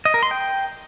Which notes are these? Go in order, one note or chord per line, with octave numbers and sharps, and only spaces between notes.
D#5
A#4
C6
G5